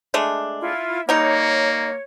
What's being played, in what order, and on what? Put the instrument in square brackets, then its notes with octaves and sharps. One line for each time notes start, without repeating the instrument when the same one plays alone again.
[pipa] G#3 A3 D4
[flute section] E4 F4
[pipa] G3 D#4 [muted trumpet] A#3 [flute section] C#5